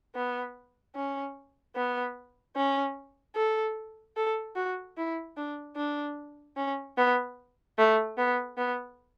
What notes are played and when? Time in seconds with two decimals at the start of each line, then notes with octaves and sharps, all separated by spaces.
0.15 B3
0.96 C#4
1.76 B3
2.56 C#4
3.36 A4
4.17 A4
4.56 F#4
4.97 E4
5.37 D4
5.77 D4
6.57 C#4
6.97 B3
7.78 A3
8.18 B3
8.58 B3